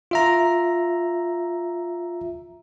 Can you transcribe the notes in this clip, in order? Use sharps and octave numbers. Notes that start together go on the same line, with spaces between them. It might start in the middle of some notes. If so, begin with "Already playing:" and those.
F4 E5 A#5